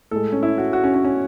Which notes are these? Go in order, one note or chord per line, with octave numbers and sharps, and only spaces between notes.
A2 G#3 A4
C#4
E4
F#4
F#4
C#4
C#4
C#4